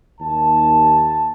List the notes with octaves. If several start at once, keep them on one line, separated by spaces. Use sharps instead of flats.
D#2 A5